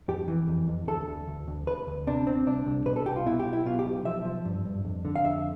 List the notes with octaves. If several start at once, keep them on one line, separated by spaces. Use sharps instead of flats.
F2 G4
E3
F2
F2
D2 A4
D2
D2
D2
D2 B4
D2
C3 D4
D2 C4
C2 D4
C2
B2 B4
A4
C2 G4
F4
B2 E4
G4
B1
E4
B2 F4
G4
B1
F3 E5
F3
G2
G2
F2
D3
F5
F2 E5